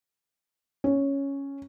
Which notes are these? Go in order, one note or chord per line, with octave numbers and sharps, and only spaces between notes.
C#4